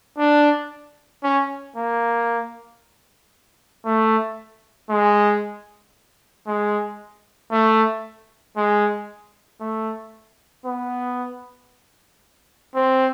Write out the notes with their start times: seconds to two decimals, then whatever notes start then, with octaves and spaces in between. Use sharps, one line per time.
0.18 D4
1.24 C#4
1.76 A#3
3.85 A3
4.90 G#3
6.47 G#3
7.52 A3
8.57 G#3
9.61 A3
10.66 B3
12.75 C4